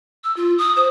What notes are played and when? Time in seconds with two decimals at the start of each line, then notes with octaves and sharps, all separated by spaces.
0.24 E6
0.37 F4
0.58 D#6
0.76 C5